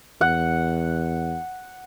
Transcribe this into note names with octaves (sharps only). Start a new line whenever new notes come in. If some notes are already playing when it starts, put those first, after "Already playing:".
E2 F#5